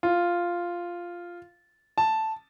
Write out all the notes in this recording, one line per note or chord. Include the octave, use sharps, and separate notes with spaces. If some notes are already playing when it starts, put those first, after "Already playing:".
F4
A5